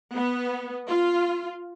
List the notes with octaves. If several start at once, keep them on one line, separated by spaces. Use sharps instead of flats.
B3
F4